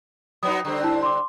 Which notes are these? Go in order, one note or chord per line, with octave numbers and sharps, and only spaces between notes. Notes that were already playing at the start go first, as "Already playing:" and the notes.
F#3 B3 D#4 D#6
D3 G3 C4
E4 A5
C6 D6